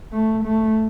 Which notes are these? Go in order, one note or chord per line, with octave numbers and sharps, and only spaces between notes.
A3
A3